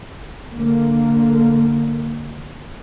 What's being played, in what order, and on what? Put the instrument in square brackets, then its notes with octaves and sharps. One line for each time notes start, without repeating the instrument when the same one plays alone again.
[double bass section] D3 A#3